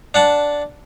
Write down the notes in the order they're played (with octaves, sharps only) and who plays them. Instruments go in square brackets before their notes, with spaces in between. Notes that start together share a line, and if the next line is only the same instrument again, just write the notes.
[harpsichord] D4 F#5 A5